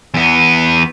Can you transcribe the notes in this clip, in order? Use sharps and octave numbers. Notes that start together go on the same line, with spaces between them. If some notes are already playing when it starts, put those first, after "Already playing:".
E2 B3